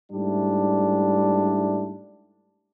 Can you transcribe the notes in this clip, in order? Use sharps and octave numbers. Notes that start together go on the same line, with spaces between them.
G#2 G3 A3 D4 E4